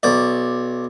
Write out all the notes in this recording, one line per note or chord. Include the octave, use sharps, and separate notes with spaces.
B1 D5